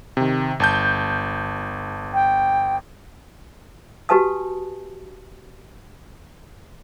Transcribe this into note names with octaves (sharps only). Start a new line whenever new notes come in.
C3 D#3
G1 A5 G6
G5
F#4 G4 B4 G#5 A5 D#6